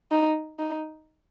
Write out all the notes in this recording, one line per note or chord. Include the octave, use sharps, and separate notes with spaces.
D#4
D#4